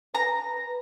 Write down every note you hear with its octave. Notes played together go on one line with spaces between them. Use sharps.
B4 A#5